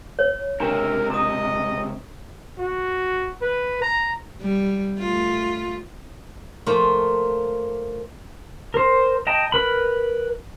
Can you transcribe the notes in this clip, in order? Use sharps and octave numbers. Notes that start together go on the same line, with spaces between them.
C#5
C#2 C3 D4 A#4 A#5
D#5 A#5 D#6
F#4
B4
A#5
G3
A3 F4
F3 A3 A#3 F4
A#4 C5
D#5 G5 A5 A#5
A#4 B4 B5